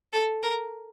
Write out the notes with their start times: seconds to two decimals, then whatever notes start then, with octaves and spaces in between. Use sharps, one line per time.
0.13 A4
0.43 A#4